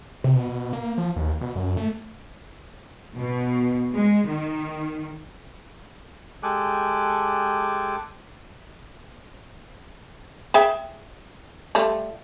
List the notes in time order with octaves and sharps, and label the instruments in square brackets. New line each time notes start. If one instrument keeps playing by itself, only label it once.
[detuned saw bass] C3
B2
B2
A#3
F3
D#2
B2
F#2
A3
[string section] B2
G#3
D#3
[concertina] G#3 G4 A4 G#5 D6 F#6
[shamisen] G#4 E5 G5
G3 A3 F4